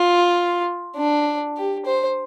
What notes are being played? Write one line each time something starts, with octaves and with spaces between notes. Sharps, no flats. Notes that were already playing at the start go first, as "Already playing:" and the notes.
Already playing: F4
D4
G4
C5